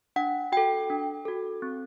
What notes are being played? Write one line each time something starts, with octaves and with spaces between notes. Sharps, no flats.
D4 F#5
F#4 A4 G5
D4
F#4 A4
C4